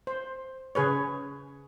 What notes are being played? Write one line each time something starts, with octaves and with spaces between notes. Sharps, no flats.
C5
C#3 G#4 B4 C#5